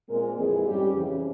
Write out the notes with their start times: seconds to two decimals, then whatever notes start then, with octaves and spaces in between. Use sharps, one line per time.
0.09 A#2 G#3 C4 A#4
0.37 F2 E3 G#3 G#4
0.65 G#2 G3 C#4 G4
0.93 F2 C#3 E3